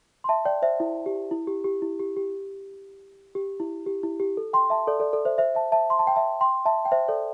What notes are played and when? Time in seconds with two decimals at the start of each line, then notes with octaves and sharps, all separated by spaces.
0.24 C6
0.29 E5 A5
0.45 D5 G5
0.62 C5 E5
0.80 E4
1.06 G4
1.31 E4
1.47 G4
1.64 G4
1.82 E4
1.99 G4
2.16 G4
3.35 G4
3.60 E4
3.86 G4
4.03 E4
4.20 G4
4.37 A4
4.53 G5 C6
4.70 E5 A5
4.87 A4 D5
5.00 A4 D5
5.13 A4 D5
5.25 C5 E5
5.38 C5 E5
5.55 E5 A5
5.72 E5 A5
5.90 C6
5.99 A5
6.07 G5
6.16 E5 A5
6.41 G5 C6
6.65 E5 A5
6.85 G5
6.92 C5 E5
7.08 A4 D5